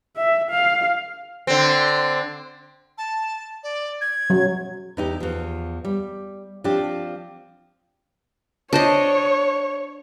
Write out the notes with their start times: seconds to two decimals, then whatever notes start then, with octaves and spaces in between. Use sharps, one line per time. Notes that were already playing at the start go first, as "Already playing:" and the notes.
0.17 E5
0.50 F5
1.47 D3 C4
2.98 A5
3.63 D5
4.01 G#6
4.30 F#3
4.97 E2 D#4 G4
5.20 E2 F3
5.85 G3
6.64 F3 C4 D4 G4
8.73 D4 C5 C#5 D#5